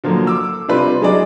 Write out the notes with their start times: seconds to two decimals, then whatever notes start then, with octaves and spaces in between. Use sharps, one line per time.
0.04 D3 F3 F#3 A#3
0.27 D6 E6
0.68 C3 G3 C4 D4 F4 B4
1.01 F#3 G#3 D4 E4 G#4 D5